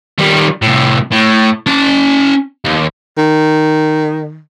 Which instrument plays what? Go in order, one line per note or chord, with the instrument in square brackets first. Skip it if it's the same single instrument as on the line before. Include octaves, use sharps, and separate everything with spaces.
[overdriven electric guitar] D#3 G3
C2 A2
A2
C#4 A5
D#2
[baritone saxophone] D#3